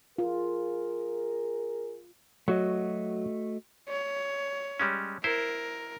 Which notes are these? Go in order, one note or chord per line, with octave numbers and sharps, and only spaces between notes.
F4 G#4 A#4
F#3 A3 F#4 D#5
C#5
G3 G#3 C#4
E4 A#4 C5